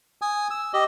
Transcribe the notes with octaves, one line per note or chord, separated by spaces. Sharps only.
G#5 D#6
E6
G4 D#5